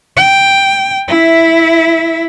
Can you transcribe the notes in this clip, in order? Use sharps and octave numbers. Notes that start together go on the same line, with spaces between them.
G5
E4 E5